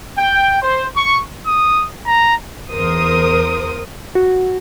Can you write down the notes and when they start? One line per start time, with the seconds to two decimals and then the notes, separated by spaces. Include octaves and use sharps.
0.18 G5
0.62 C5
0.95 C#6
1.46 D#6
2.06 A#5
2.72 E2 A#4 C5 D#6
4.15 F#4